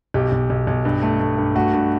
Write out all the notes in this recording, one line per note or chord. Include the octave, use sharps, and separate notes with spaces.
B1 G4
B1
B1
B1
G2
A3
A3
G2
A3 F#4
G2